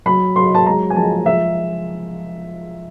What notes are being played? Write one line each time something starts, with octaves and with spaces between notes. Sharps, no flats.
F#3 B5
F#3 C6
A5
G#3 A#5
G#5
F3 A5
F3 E5